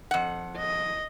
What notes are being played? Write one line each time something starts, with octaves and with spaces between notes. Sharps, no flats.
F2 F#5
D#5